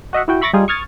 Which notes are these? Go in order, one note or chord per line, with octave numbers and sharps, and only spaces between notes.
F#4 D#5 E5 F#5
E4 F#4 G5
E5 B5 C#6 A6 A#6 D7
G3 D#4 F4 G#4
C#6 D#6 F6 G#6 A6 C#7